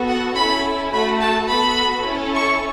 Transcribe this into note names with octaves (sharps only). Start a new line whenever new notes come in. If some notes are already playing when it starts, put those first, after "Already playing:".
Already playing: B3 F#4 A4
F#5
C#4 E4 A4 B5
A3 F#4 A4 B5
A5
B3 F#4 A4 B5
C#4 E4 A4
C#6